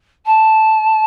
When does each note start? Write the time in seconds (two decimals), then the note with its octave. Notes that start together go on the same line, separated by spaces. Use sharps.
0.25 A5